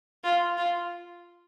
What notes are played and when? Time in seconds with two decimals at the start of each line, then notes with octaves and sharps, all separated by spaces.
0.24 F4
0.57 F4